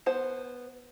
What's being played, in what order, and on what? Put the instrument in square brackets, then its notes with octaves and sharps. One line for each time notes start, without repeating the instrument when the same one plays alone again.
[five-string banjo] B3 C5